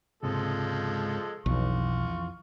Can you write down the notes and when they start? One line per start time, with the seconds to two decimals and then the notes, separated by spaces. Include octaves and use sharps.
0.23 C#2 G#2 C3 F3 G#3 A4
1.46 B1 F2 E3 F4 C#6